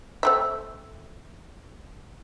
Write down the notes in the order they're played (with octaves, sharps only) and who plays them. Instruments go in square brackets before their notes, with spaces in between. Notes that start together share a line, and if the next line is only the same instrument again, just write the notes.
[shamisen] A3 C4 E5